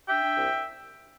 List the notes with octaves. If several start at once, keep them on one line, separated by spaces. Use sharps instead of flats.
D4 E5 G5
D4
C2